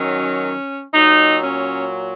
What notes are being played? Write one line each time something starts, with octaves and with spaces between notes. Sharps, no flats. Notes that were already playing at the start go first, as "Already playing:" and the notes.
Already playing: F#2 D#3 F#3 C#4
A#2 F#3 D#4
C#4